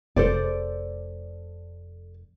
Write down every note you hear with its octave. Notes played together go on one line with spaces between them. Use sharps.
F1 A4 C5 D5